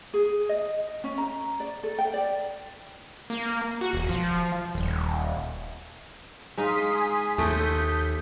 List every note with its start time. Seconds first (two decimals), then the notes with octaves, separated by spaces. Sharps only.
0.14 G#4
0.49 D#5
1.04 C#4
1.18 A#5
1.60 D5
1.83 A4
1.99 G5
2.14 D5
3.30 A#3
3.81 F#4
3.93 E1
4.09 F3
4.75 D#1
6.58 G#3 D#4 F4 F5 C6 D#6 B6
6.93 G#5
7.38 D#2 A3 A4 C6 D#6 G6 B6